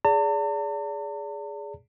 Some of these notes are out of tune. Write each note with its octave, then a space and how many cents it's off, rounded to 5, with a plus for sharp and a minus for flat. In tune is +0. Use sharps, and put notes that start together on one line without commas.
G#4 +0 D5 -35 A5 +45